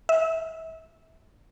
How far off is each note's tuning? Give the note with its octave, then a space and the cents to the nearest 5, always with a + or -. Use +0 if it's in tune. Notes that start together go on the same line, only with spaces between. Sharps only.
E5 -30